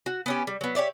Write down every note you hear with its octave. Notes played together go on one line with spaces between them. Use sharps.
F#4
B3 C#4 G4
G3
F#3 B3
G4 C#5 D5 E5